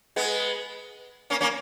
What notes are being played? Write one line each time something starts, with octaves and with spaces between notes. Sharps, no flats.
G#3 B3
A#3 C#4
A#3 C#4